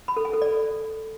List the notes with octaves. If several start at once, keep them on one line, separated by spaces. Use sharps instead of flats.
B5
A4
G#5
A4
D5